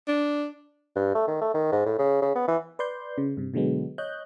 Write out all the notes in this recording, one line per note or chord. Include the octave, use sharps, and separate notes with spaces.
D4
G2
A3
D#3
A3
D#3
G#2
A2
C#3
C#3
B3
E3
B4 D5 C6 G6
C#3
G2 C3
B2 D3 F#3 G#3 B3
C#5 D#5 F#6 G6